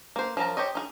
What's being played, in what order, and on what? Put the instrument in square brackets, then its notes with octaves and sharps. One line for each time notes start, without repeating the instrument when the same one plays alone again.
[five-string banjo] A#3 C5
F3 F#3 A#4 A5 A#5
G4 C5 C#5 D#5
D#4 F4 G#4